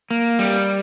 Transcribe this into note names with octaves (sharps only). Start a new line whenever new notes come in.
A#3
G3